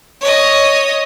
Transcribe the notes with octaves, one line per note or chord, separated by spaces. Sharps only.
C#5 D#5